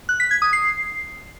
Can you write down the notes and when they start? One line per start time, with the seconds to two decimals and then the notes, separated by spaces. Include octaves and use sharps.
0.09 F#6
0.20 B6
0.31 G#6
0.42 D#6
0.53 C7